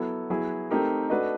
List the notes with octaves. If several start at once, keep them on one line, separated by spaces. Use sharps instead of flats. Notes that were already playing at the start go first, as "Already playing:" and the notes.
Already playing: F#3 B3 E4 A4
F#3 B3 E4 G#4
A3 C4 D#4 G4 A#4
A3 D4 F#4 B4 D#5